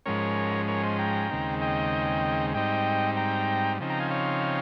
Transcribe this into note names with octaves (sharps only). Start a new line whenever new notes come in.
G#2 F3 G#3 C#4 A#4 C#5
A#4 C#5
C5 D#5
G5 A#5
D#2 C#3 G#3 C4 D#4
D#5 G5
G#2 G3 C4 D#4 D#5 G5
G5 A#5
C#3 F3 C4 D#4
G5 A#5
F5 G#5
C#5 F5